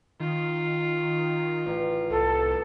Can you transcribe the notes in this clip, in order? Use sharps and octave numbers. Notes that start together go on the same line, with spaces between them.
D#3 F4
A1
C2 A4